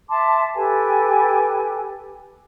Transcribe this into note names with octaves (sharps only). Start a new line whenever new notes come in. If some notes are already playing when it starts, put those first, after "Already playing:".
E5 A5 C6 D6
G4 A4 B4 G#5